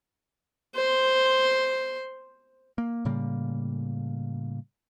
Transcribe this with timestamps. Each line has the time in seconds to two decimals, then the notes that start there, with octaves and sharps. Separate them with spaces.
0.75 C5 C6
2.78 A#3
3.05 A2 C#3 G3 A#3